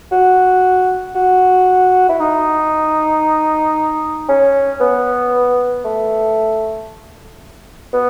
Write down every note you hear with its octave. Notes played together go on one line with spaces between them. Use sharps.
F#4
F#4
E4
D#4
C#4
B3
A3
B3